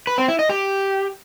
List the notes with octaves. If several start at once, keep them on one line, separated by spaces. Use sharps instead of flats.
B4
C4
E4
D#5
G4